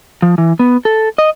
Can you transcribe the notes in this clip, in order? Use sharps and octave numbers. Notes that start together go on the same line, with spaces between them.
F3
E3
B3
A4
D#5